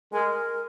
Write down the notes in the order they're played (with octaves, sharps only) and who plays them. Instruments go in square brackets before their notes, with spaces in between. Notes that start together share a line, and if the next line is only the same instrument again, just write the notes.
[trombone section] G#3 [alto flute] A#4